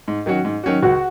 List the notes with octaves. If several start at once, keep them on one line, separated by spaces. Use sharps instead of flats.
G#2
D#3 F#3 C#4 F#4
G#2
D#3 F#3 C#4 F#4
C#2 F#4